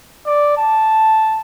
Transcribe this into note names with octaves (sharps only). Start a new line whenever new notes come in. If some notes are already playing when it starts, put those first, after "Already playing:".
D5
A5